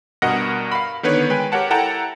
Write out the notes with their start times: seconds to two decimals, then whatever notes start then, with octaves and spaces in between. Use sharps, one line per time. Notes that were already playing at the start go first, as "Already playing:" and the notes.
0.22 G2 B2 A#4 D#5 F#5 A#6
0.72 F5 B5
1.03 D3 D#3 B3 B4 C#5
1.29 G#3 B4 G5 G#5
1.52 G4 A#4 C#5 F#5 A5
1.70 E4 A4 F#5 G5 A5 A#5